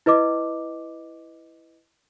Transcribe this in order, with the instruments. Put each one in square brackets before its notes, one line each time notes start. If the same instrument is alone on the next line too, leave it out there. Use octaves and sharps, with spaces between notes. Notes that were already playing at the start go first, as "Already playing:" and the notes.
[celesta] E4 B4 D#5 D6